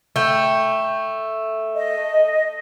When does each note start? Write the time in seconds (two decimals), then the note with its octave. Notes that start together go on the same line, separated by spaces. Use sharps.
0.16 A3 G5
1.76 D#5